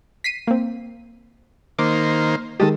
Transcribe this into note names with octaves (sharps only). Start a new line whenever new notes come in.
B6 C7 D#7
A#3 C4
D#3 A#3 C5 D6
D#3 G#3 G4 A4 D#5